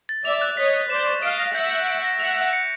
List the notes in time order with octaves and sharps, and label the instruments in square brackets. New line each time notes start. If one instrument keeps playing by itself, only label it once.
[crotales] A6
[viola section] D5 E5 [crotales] F7
[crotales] F#6
[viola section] C#5 D#5 [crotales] B6
[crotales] F#6
[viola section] C5 D5 [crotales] E7
[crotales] C#6
[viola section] D#5 F5 [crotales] D7
[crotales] A#6
[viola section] E5 F#5 [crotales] G6
[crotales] G6
D7
A#6
[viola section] E5 F#5 [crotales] F7
[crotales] F#6
C#7